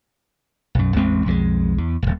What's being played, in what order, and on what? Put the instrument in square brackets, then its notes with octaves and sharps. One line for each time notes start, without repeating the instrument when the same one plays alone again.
[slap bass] B1 F#2
A1 E2 G#3 C4
B1 F2 E3 G#3
E2
D#1 B1